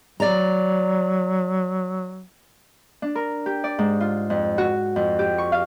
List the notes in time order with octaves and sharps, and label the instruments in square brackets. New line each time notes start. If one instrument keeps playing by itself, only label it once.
[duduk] F#3 [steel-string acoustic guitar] D5 A#5
[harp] D4
A#4
G4
D5
G#2
F4
F2
F#4
F2
G4
C#6
F5